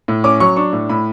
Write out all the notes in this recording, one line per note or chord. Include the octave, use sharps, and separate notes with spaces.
A2
C#4 D6
F#3 C#6
D4 C#6
A2
A2 B5